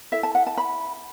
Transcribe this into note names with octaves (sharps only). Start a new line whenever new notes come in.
E4 A4 E5
A5
F#5
A5
B5